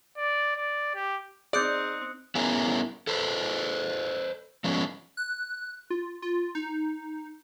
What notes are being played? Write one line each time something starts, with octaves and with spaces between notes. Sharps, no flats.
D5
D5
G4
C4 D#4 G#4 D5 D#6 F#6 G6 C#7
B3 C#4 E4 G#4 A#4
A4 B4 C5
F3 G#3 B3 C#4
F#6
F4
F4
D#4